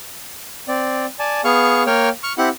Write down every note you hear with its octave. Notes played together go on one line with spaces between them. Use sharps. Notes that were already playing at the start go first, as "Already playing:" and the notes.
C4 D5
D5 G#5 A5
B3 G#4 F5 C#6
A#3 C#5 G5 F6
C#6 F6
C4 E4 G4 F#5 F#6